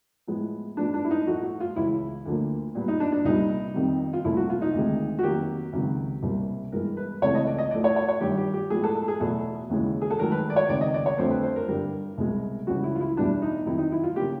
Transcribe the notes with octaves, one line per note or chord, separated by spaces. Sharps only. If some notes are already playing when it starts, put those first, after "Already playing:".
A2 F3 G#3 B3
G#2 F3 G#3 B3 D4
D4
E4
D#4
A2 F3 A3 F#4
F#4
F4
C#2 C#3 E3 E4
D2 D3 F3 A#3
A#2 G3 B3
D#4
D4
D4
C2 A#2 G3 B3 D#4
F2 C3 D#3 G3
F4
C2 A#2 F3 A3 E4
F#4
F4
D#4
D2 C3 D#3 G#3
F#4
F2 C3 D#3 F#3 A#3 G4
C#2 C3 D#3 F#3
C2 B2 G3 A#3
G2 E3 G#3 B3 A#4
B4
C#2 C3 E3 A3 C#5
D#5
D5
D#5
A2 F3 A3 D5
C#5
C#5
C#5
G2 D#3 G3 G4
G4
G4
A2 F3 G#3 B3 G#4
A4
A4
G#4
E2 B2 F#3 A3 A4
D#2 C#3 E3 G#3
G#4
A4
G#2 D#3 F#3 A3 A#4
B4
D5
C#5
C#2 C3 D#3 D5
D#5
D5
C#5
F2 D3 F3 A3 C5
B4
C5
A#4
G2 D3 G3 A#4
C2 B2 G#3
C#2 C#3 E3 G3 F#4
E4
F4
E4
E2 B2 G3 B3 D4
D#4
F2 C3 D#3 F#3 E4
D#4
E4
F4
C#3 F3 A#3 G4